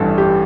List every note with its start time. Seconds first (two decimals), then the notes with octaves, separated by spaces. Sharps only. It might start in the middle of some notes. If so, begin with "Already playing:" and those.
Already playing: A1 G2 E3 A4
0.18 G4